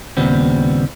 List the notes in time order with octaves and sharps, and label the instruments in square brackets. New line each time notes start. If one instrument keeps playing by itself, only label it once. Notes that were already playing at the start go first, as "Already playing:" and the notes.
[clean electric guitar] D#2 A#2 C#3 G3 B3 C4